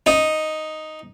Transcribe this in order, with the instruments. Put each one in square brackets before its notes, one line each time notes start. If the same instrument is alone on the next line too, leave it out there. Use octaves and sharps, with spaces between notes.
[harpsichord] D#4